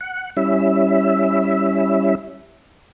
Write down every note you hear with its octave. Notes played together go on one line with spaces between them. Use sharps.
F#5
G3 C#4 E4 E5